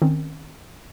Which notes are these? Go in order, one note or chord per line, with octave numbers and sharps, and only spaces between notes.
D#3 C4 C#4